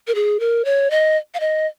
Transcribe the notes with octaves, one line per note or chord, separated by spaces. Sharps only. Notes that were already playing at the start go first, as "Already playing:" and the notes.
A#4
G#4
A#4
C#5
D#5
F5
D#5